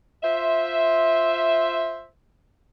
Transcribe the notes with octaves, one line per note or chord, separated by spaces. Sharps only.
F4 C5 E5